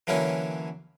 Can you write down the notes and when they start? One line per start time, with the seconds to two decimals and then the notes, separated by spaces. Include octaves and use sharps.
0.07 D3 E3 F#3 A#3 C#4